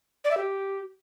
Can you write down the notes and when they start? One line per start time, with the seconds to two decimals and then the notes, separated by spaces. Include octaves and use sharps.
0.25 D5
0.31 E5
0.37 G4